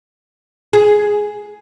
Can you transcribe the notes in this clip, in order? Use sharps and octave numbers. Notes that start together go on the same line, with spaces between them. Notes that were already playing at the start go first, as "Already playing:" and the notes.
G#4